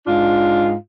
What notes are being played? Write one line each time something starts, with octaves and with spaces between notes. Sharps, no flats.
G#2 D4 F4